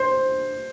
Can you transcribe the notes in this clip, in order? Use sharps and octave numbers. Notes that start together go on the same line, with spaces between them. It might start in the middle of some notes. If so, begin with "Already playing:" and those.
Already playing: C5